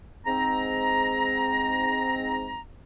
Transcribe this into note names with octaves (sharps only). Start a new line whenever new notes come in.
G#2 C4 A#5